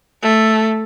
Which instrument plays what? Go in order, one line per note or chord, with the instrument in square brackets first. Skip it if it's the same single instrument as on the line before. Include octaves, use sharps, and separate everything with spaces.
[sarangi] A3